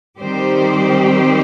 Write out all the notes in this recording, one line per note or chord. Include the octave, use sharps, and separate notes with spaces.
D#3 G3 C4 G4 C5